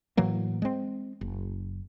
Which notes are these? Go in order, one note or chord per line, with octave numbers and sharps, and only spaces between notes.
A2 E3 F#3 A#3
G#3 C4
F#1